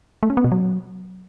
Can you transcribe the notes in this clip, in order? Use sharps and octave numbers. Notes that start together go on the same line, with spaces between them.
A3
C#4
B3
B2
F#3